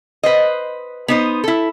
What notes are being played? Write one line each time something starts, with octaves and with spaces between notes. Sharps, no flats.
B4 C5 D#5
B3 D#4 C5
E4 A4